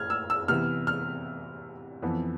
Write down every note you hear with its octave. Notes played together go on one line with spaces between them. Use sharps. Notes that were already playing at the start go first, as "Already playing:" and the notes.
Already playing: A2 F6 G#6
E6
E6
C3 E3 B3 F6
F6
F2 E3 B3